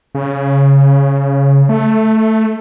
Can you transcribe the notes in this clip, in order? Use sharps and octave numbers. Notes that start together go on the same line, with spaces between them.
C#3
A3